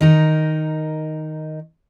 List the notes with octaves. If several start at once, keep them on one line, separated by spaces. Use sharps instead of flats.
D#3 D#4 A#4